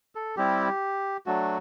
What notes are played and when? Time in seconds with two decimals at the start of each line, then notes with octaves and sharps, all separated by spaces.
0.15 A4
0.37 G3 C4 E4 G4
1.26 F#3 A3 D4 F#4